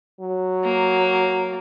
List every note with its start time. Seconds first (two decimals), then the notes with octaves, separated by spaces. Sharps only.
0.20 F#3
0.64 A#3